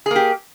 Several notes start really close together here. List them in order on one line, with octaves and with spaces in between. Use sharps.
G#4 A#3 G4